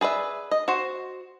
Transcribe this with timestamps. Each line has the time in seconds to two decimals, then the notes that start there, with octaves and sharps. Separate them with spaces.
0.01 G#4 B4 D5 E5
0.51 D#5
0.68 F#4 C5